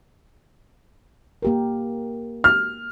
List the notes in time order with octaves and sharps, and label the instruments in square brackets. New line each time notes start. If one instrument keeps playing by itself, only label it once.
[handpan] A#3 G4 A#4
[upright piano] F6